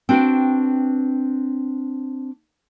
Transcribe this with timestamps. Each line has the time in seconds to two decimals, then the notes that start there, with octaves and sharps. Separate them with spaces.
0.09 C4 D4 F#4 A#4 B4 G5